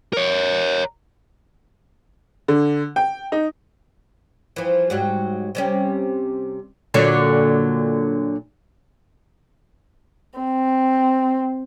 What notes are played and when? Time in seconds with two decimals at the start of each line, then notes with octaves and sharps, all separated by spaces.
0.13 A#4 C#5
2.48 D3
2.96 G5
3.32 D#4
4.56 E3 F3
4.90 G#2 F#3 G3
5.55 C3 G3 C#4
6.94 A#2 D3 F#3
10.39 C4